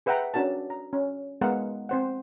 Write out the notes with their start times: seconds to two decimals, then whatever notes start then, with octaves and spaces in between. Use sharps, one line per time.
0.06 G#4 B4 E5 F#5 G5 A#5
0.34 C#4 D4 F#4 A#4 A5
0.70 A#5
0.93 C#4
1.41 G#3 B3 A#4 F5 F#5
1.89 C4 C5 F#5